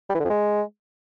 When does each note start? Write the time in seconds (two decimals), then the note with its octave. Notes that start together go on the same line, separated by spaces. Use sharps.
0.10 G3
0.15 E3
0.20 D3
0.25 F2
0.30 G#3